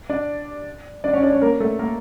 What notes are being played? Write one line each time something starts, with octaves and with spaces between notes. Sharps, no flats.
D4 D5
D4 D5
C#4 C#5
D4 D5
C#4 C#5
A#3 A#4
A3 A4
A#3 A#4